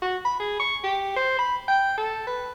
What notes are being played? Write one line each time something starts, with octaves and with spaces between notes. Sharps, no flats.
F#4
B5
G#4
C#6
G4
C5
B5
G5
A4
B4